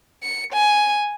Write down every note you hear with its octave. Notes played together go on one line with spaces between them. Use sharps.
C#7
G#5